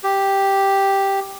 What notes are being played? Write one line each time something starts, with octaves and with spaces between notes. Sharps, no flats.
G4